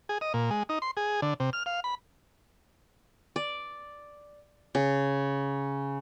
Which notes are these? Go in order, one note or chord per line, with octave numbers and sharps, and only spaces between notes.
G#4
D#5
A#2
G#3
D#4
C6
G#4
D3
C3
F6
F5
B5
D5
C#3